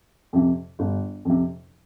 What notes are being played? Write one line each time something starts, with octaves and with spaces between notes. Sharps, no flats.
F2 C3
G1
F2 C3